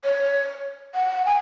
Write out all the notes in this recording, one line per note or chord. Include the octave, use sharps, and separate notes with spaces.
C#5
F#5
G#5